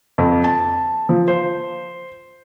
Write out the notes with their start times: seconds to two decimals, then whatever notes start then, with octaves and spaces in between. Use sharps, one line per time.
0.18 F2
0.44 A5
1.09 F3
1.28 C5